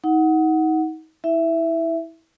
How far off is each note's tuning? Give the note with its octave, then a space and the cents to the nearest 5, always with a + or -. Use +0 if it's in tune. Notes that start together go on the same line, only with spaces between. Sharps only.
D#4 +30 F#5 +0
E4 -20 E5 +10